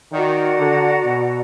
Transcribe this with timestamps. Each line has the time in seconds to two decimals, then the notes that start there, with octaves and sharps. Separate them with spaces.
0.11 D#3 F#4 D5 F#5 A#5
0.58 D3
1.05 B2